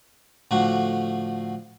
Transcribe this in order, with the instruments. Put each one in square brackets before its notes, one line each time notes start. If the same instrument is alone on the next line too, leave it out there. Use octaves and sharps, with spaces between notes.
[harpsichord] A2 D3 F3 D4 F#4